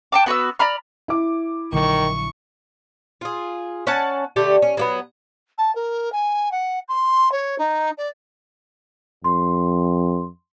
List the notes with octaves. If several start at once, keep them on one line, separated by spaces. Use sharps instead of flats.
G5 A5 D6
B3 F#4 B4 E6
D5 A#5 B5 F6
E4 D6
A#1 D3 D#3 F#3 C#6
F4 G#4
C#4 F#5 G#5 A5
D3 A3 G4
C#4
F#3 A#3 B3
A5
A#4
G#5
F#5
C6
C#5
D#4
D5
F2 C6